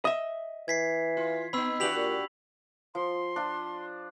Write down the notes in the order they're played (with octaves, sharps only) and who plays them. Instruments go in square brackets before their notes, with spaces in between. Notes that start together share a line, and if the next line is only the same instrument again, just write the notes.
[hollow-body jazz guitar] D#5 E5
[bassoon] E3 [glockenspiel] G#6 B6 C7
[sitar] F4
[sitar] B3 D#4 [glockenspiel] B5 E6
[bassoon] E3 [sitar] D4 F#4 G4 [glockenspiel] B6 F7 F#7
[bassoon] A#2
[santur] F3 [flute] C6
[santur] D4 F4